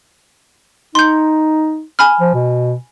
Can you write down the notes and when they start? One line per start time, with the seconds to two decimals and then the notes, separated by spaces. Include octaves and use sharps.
0.95 D#4 C6 G6
1.99 G#5 B5 F6
2.20 F3
2.34 B2